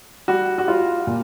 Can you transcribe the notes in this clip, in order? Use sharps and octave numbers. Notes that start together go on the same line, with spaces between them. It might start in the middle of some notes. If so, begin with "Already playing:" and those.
G3 F#4
F#4
G3 F4
A#2